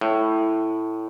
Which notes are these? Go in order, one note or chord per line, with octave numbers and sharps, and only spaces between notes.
A2